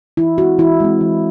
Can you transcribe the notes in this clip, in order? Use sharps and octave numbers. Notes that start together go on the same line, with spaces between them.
E3 E4
G#3 C4 F#4
E3 E4
G#3 C4
E3